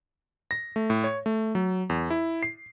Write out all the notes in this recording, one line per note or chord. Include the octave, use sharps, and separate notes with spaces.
A#6
A3
A2
C#5
A3
F#3
E2
E4
C7